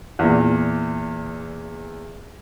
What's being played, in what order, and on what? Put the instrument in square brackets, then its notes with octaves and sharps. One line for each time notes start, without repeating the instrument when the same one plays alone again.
[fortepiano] E2 A#2